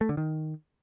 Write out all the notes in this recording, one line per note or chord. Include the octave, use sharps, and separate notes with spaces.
A3
D3
D#3